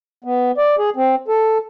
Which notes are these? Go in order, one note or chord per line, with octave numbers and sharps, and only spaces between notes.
B3
D5
G#4
C4
A4